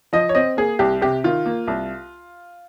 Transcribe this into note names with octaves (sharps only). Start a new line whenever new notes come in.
F3 D#5
C#5
C4 D#5
A#3 G#4
C2 G4
C3 G4
D#3 F4
A#3
C2